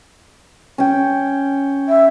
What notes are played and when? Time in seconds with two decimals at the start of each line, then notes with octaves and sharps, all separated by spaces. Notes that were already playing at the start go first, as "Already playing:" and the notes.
0.78 C#4 G5
1.89 E5